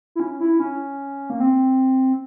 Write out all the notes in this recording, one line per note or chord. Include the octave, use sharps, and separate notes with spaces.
E4
C#4
E4
C#4
A#3
C4